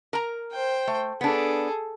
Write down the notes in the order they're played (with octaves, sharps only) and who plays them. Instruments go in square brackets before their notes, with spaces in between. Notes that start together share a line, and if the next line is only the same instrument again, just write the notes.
[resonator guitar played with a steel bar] A#4 A#5
[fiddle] C5 G5
[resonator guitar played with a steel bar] A3
[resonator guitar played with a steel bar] B3 D4 [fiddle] G#4 A4